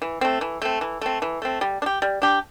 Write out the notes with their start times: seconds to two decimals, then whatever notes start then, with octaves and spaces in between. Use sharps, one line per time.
0.02 E3
0.21 A3 C4
0.41 E3
0.62 A3 C4
0.81 E3
1.01 A3 C4
1.22 E3
1.42 A3 C4
1.61 G3
1.82 D4
1.86 G4
2.02 G3
2.22 D4 G4